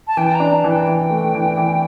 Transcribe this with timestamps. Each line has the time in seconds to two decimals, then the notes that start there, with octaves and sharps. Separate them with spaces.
0.07 A5
0.17 E3 G5
0.35 A#5
0.40 D4
0.52 A5
0.64 E3
0.70 G5
0.87 E3
1.10 A3
1.34 E3
1.57 E3